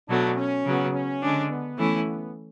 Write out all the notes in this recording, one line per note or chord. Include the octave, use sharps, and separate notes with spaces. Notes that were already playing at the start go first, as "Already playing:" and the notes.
B2 F#3 A3 D4
C#4
C#3 F#3 B3
C#4
D3 G#3 D4
B3
E3 A3 C#4 E4
B3